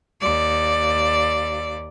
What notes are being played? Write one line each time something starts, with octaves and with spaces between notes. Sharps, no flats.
D#2 D5